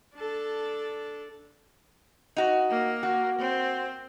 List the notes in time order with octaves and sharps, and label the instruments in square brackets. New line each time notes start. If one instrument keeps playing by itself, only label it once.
[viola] D4 A4
[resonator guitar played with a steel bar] D#4 F#4
[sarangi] A#3
[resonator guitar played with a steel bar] F#4
[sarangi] C4